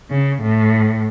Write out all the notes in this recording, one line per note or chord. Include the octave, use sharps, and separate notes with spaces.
C#3
A2